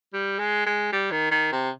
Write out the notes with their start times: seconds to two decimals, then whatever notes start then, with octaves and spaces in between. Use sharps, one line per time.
0.13 G3
0.39 G#3
0.66 G#3
0.93 G3
1.11 D#3
1.31 D#3
1.52 C3